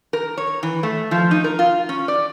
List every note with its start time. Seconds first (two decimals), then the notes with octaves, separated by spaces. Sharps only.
0.13 A#4
0.37 C#5
0.63 E3
0.83 A3
1.11 F3
1.31 D#4
1.44 A#4
1.59 F4
1.89 C#4
2.08 D5